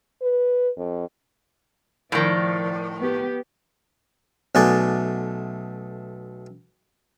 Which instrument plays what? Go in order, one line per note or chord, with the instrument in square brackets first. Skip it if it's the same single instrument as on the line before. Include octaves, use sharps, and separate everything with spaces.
[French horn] B4
F2
[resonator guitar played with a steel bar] A2 D#3 [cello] F3 D5
[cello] B3 G4
[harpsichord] B1 A3 G#4 D5 F#5 C6